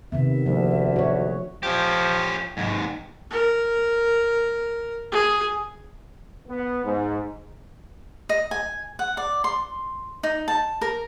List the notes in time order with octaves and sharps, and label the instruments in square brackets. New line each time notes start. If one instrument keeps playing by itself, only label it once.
[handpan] C3 D#3 B3 [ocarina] E5
[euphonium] D2 [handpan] F3 A#3
[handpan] F#4 C#5
[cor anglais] F3 [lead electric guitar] C#4 G4
[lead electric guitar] D#2 G#2
[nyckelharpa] A#4
G#4
[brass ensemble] B3
G#2
[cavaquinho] D#5
G#5
F#5
D5
C6
D#4
A5
A#4